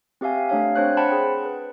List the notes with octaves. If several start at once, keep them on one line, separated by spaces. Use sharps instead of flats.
C4 G4 E5 F5 G#5
A3 D4 C#5 F5
C4 D4 C5 C#5 F#6
C5 F#5 G5 A5 B5
G#4
B4